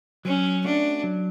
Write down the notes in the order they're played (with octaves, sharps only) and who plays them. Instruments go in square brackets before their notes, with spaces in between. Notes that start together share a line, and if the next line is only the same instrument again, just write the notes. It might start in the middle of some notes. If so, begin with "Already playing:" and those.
[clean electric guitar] F#3 [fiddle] C#4
[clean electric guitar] A3 C#4 F#4 [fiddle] D4
[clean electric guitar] F#3